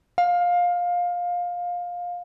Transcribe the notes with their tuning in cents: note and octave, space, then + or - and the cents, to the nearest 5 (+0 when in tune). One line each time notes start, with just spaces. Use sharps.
F5 +20